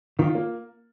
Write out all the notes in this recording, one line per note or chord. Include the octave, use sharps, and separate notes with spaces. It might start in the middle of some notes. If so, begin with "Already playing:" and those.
D#3 F4
A#3